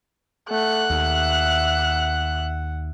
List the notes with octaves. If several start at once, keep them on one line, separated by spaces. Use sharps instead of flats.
A3 F#5 F#6
D#2 E5